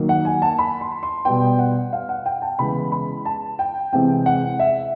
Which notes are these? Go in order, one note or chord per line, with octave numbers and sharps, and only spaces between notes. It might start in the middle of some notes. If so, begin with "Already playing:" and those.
Already playing: D#3 F#3 A#3
F#5
G#5
A5
B5
C6
C6
B2 G3 B3 G5
F#5
F5
F#5
G5
A5
C#3 E3 G#3 B3 B5
B5
A5
G5
C3 E3 G#3 C4 G5
F#5
E5